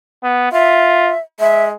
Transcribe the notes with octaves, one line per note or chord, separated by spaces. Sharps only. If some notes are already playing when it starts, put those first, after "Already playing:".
B3
F4 E5
G#3 E5